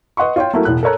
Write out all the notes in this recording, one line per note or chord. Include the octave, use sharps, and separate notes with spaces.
B4 D#5 F#5 C6 C#6
F4 C#5 G5
F#3 A3 A#3 E4
E1 A2 F#6
A4 A#4 C#5 A#5 F#6